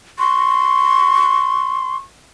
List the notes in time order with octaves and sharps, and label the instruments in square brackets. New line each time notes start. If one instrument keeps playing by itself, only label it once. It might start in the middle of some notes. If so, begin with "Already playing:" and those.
[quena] C6 [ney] C#6